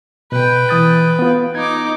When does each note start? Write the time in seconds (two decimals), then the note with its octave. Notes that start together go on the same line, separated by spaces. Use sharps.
0.32 B2 B4 G5
0.69 E3 D#6 A6
1.19 B3 F4
1.55 D#4 D6 G#6